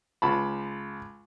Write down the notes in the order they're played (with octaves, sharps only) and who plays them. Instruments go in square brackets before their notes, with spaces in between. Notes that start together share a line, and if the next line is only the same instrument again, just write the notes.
[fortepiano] C#2 A5 B5